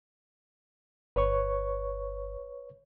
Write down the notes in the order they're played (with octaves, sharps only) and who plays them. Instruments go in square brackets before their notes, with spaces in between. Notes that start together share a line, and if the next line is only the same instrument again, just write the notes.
[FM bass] G1 [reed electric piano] B4 C#5 C#6